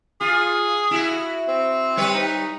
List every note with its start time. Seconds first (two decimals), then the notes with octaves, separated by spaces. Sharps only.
0.21 F4 G#4
0.91 E4 F#4
1.48 C4
1.97 G3 B4 C#5
2.14 D#4